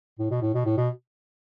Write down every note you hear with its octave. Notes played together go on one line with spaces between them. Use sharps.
A2
B2
A2
B2
A2
B2